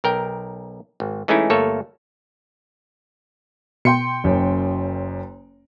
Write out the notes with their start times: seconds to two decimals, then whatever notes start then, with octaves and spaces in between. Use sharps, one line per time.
0.04 B1 A#4 G5
1.00 G#1
1.28 E3 G#3 A3 C#4 D#4 E4
1.50 G1 A3 A#3 A4 C#5
3.85 B2 G5 C6 C#7
4.24 F#1 F#2